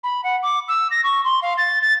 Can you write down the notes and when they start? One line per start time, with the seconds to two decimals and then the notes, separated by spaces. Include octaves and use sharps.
0.03 B5
0.24 F#5
0.43 D6
0.68 E6
0.91 A#6
1.04 C#6
1.24 C6
1.42 F5
1.57 A6
1.81 A6